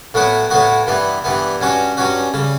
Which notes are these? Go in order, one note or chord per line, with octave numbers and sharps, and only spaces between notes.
A2 F#3 B3 F#4
A2 F#3 B3 F#4
G2 E3 B3
G2 E3 B3
G2 F#3 C#4 F#4
G2 F#3 C#4 F#4
C#3 G3